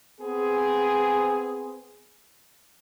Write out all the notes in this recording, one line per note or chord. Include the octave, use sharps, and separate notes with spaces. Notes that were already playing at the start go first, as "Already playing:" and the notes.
B3 C4 G#4